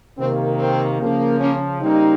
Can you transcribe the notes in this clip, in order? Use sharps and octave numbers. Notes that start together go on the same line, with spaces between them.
C3 D#3 A#3 C4
C4
C#3 F3 A#3
A#3 C#4
C#3 G3 A#3 C4 D#4